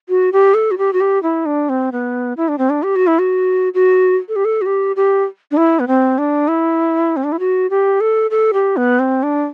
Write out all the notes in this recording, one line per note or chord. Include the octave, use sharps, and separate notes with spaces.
F#4
G4
A4
F#4
G4
F#4
G4
E4
D4
C4
B3
E4
D4
C4
D4
G4
F#4
E4
F#4
F#4
A4
G4
A4
F#4
G4
G4
D4
E4
B3
C4
D4
E4
C4
D4
E4
F#4
G4
A4
A4
G4
B3
C4
D4